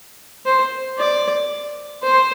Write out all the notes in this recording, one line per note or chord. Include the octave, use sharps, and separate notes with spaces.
C5
D5
C5